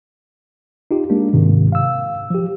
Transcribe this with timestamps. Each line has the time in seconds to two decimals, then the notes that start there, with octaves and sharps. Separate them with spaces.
0.91 D#4 F4 G4
1.10 G#3 A#3 D4
1.33 G#2 C3 D#3
1.72 F5 E6
2.30 F3 G4